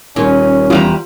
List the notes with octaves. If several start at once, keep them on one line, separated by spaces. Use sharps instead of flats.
D#1 A#2 C#4
E2 G3 F4 A#5